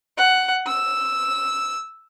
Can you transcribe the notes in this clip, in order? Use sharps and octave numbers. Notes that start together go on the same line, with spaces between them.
F#5
E6